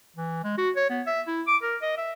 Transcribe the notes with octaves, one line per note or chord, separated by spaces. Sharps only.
E3
G#3
F#4
C#5
B3
E5
E4
D6
A#4
D#5
E5